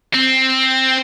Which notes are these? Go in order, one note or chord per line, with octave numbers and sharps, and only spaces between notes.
C4